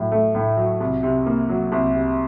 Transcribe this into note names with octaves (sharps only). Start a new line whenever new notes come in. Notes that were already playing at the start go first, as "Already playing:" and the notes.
Already playing: A2 F#3
A3
A2
F#3
C2
C3
A#3
F#3
C2
C3